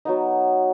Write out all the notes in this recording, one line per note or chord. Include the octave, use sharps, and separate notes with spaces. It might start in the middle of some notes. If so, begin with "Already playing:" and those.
F#3 B3 D#4